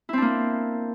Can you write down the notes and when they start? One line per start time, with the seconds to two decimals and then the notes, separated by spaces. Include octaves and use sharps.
0.09 E4
0.13 C4
0.18 D4
0.22 A#3